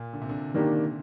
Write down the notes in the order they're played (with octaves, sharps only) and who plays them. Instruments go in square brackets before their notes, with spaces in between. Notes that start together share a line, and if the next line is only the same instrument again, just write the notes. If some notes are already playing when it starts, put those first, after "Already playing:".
Already playing: [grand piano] A#2
D3
C3
D3
[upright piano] D#3 A#3 D4 G4